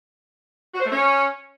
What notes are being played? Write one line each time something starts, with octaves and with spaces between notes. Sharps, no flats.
F#4
C5
A3
C#4